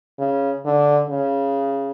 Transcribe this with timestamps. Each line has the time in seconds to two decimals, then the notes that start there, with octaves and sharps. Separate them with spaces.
0.19 C#3
0.65 D3
1.10 C#3